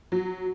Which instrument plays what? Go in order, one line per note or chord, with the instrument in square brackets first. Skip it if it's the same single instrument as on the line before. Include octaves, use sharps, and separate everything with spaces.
[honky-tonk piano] F#3